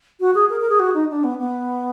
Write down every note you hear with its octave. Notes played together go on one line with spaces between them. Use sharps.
F#4
G#4
A#4
A#4
G#4
F#4
D#4
D4
B3
B3